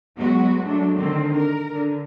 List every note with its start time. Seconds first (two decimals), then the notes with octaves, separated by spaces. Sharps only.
0.16 F#3 G#3 B3 F#4
0.64 F#3 G#3 A3 D4
0.96 D3 D#3 C4
1.35 A#4
1.73 D3